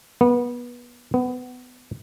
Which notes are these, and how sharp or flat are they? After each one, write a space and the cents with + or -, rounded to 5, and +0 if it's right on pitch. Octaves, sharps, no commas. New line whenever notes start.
B3 -25
B3 +20